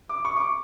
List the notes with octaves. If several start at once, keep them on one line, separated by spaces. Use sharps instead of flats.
D6
C#6
D6
C#6